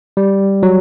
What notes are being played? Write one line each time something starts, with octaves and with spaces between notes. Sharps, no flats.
G3
F#3